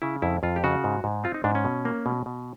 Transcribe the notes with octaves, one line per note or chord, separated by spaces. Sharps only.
C#3 E4
F2 E4
F2 F4
G4
C#3 F#4
G#2
G#2
C4 F4
D#4
G#2 D4
C#4
B2
A#3
B2
B2